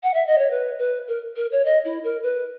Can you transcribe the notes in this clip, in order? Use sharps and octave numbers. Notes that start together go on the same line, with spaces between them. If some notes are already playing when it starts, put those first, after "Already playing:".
F#5
E5
D#5
C#5
B4
B4
A#4
A#4
C#5
D#5
E4
A#4
B4